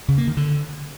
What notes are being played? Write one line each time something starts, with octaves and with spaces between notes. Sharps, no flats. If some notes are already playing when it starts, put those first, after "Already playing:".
C#3
A#3
D#3
D3